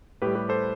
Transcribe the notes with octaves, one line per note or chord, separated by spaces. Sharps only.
A2 G4 B4
G3
G4 B4
A4 C5